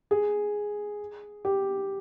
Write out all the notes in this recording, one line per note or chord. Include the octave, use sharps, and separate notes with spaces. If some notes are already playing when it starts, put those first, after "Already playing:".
G#4
G4